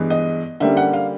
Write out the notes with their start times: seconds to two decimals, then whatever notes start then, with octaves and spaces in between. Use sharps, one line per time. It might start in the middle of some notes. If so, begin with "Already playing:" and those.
Already playing: G2 E3 G#3 B3
0.10 D#5
0.60 D3 G3 A#3 C#4 E5
0.77 F#5
0.93 F5